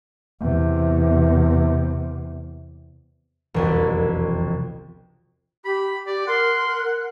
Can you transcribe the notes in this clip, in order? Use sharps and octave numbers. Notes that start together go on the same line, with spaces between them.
E2 C3
E1 C2 F2
G4 B5
G4 D5
A#4 F#5 C6